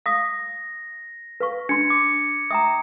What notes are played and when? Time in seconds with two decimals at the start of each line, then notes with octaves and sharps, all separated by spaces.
0.06 F5 D#6 A#6
1.40 B4 F5 C#6
1.69 D4 C6 G#6 C#7
1.90 D6
2.51 E5 G5 A#5 D#6